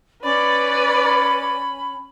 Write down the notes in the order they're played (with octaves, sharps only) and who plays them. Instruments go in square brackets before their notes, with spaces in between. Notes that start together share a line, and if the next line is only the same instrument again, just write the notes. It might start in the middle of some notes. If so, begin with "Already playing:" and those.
[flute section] C#4 B5 [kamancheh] B4 D5